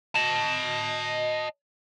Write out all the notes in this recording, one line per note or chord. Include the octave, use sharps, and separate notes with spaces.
D#5 A5